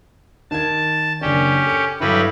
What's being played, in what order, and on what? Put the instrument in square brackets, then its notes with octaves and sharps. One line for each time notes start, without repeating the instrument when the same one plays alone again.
[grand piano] D#3 G#6 [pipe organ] A5
[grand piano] F#1 D4 [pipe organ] C#4 G4
[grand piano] A4 C#7
[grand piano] G2 D3 E4 [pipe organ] F#3 G3 B4